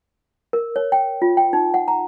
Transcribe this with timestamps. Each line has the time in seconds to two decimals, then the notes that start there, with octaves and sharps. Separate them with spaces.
0.53 A#4
0.76 C#5
0.92 G5
1.22 F4
1.37 G5
1.53 D#4
1.74 F#5
1.88 A#5